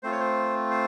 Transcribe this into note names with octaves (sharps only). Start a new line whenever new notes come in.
A3 C4 F4 C5
C#5
C5
C5